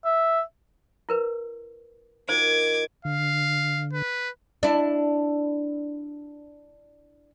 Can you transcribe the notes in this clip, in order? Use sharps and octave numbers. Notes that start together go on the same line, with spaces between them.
E5
E4 A#4 B4
D#3 F4 F#4 C5 D6 G#6
D3 F5
B4
D4 E4